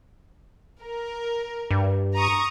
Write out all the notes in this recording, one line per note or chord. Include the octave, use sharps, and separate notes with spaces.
A#4
G2
A#5 C#6 D#6